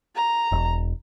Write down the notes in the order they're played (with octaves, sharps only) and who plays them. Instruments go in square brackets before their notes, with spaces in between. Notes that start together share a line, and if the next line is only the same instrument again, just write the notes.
[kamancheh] A#5
[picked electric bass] E1